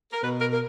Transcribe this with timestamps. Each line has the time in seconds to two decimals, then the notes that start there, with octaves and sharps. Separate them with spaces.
0.13 A#4
0.23 B2 B4
0.41 A#4
0.53 A#4